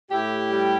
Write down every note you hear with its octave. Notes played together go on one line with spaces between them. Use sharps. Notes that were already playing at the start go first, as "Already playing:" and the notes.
A2 E4 G4
G3